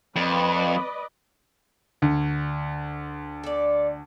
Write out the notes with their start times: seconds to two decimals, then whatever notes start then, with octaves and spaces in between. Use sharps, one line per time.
0.16 F2 B4 D5 D#5
2.02 D2
3.44 A4 D5